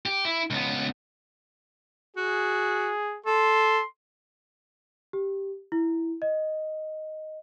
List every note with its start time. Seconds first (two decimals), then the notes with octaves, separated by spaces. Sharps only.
0.06 G4
0.25 E4
0.51 C#2 B3
2.17 F#4 G#4
3.26 A4 C6
5.13 G4
5.72 E4
6.22 D#5